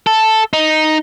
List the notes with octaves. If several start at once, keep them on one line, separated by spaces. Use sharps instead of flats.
A4
D#4